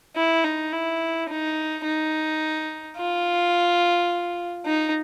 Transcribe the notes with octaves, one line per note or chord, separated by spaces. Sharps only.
E4
D#4
E4
D#4
D#4
F4
D#4